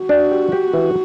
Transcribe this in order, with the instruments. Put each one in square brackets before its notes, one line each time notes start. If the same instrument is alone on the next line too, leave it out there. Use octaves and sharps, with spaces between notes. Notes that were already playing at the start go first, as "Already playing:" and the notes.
Already playing: [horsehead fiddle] F#4
[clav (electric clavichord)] D4
G4
G4
E3